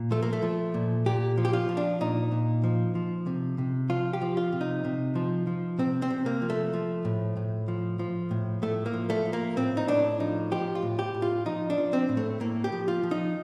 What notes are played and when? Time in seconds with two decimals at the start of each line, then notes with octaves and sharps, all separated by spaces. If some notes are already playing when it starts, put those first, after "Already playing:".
Already playing: A#2
0.11 F3 A3
0.22 A#3
0.33 A3
0.42 F3
0.74 A#2
1.06 A#2 G4
1.37 F3
1.45 G4
1.53 F4
1.69 F3
1.77 D4
2.01 A#2 D#4
2.32 A#2
2.64 F3
2.95 F3
3.27 C3
3.58 C3
3.90 F3 F4
4.13 G4
4.21 F3
4.37 F4
4.53 C3
4.61 D#4
4.85 C3
5.15 F3
5.47 F3
5.79 C3 C4
6.02 C4
6.10 C3
6.26 A#3
6.42 F3
6.50 A3
6.73 F3
7.05 A2
7.37 A2
7.68 F3
7.99 F3
8.31 A2
8.62 A2 A3
8.86 A#3
8.94 F3
9.10 A3
9.26 F3
9.33 A#3
9.57 A2 C4
9.77 D#4
9.88 A2 D4
10.20 F3 D#4
10.51 F3 G4
10.75 F4
10.83 A2
10.99 G4
11.14 A2
11.22 F4
11.46 F3 D#4
11.70 D4
11.78 F3
11.93 C4
12.09 A2
12.17 A3
12.40 A2 A#3
12.64 G4
12.72 F3
12.88 F4
13.03 F3
13.11 D#4